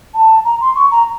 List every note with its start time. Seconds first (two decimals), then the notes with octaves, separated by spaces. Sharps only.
0.14 A5
0.45 A#5
0.61 C6
0.76 C#6
0.91 A#5